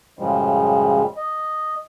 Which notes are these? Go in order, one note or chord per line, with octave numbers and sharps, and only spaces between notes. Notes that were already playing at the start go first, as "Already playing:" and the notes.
F#2 A2 C#3 F3 G3 G#3
D#5